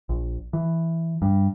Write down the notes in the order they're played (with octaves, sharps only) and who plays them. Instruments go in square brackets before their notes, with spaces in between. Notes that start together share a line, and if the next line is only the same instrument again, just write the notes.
[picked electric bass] A#1
E3
G2